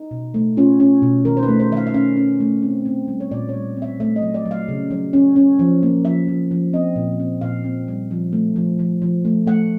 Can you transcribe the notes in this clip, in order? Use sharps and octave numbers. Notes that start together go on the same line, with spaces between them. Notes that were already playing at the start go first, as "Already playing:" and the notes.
Already playing: D#4
B2
A3
C#4 F4
C#4
B2
D#3 A#4
C5
B4
A3
C5
D#3 E5
F5
E5
C#4 F5
C#4
A3
C4
C4
G3
C#5
A#2 D5
G3 C#5
C4
E5
A3 E5
D#5
F#3
D5
F#3
F5
C#3
F#3
C#4
C#4
F3
A#3
F3 E5
F3
F3
C4 D#5
A#2
C4
A#2 F5
C4
G3
F3
A3
F3
F3
F3
A3
A3 F#5